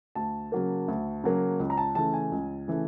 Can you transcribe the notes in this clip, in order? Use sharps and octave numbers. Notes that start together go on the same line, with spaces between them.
D2 A5
C#3 F#3 A#3
D2
C#3 F#3 A#3
C#2
A#5
A5
C#3 E3 A3 A5
G#5
C#2
C#3 E3 A3